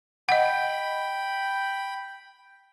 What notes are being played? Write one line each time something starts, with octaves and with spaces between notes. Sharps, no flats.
D#5 F#5 G5 B5